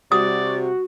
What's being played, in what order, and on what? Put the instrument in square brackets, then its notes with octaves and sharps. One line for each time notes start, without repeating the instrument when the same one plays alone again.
[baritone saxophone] C3 [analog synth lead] F#4 [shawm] D5 [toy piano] D#6